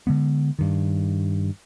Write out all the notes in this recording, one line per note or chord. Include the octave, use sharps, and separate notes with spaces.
D3 G#3 B3
G2 D#3